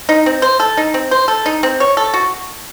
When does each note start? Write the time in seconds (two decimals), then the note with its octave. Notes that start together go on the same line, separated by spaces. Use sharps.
0.09 D#4
0.26 C4
0.42 C5
0.60 A4
0.77 D#4
0.94 C4
1.11 C5
1.28 A4
1.46 D#4
1.63 C4
1.80 C#5
1.97 A4
2.14 F#4